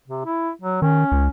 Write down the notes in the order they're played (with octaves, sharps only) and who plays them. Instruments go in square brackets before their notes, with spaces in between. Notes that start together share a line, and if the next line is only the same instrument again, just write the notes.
[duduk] C3
E4
F#3
[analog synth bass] D#3 [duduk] C#4
[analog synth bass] C#2